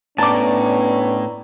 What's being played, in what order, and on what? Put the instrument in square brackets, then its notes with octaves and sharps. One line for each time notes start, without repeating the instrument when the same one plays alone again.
[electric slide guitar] A2 [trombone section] B3 C#4 D4 [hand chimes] D5 A#5 [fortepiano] A5 D6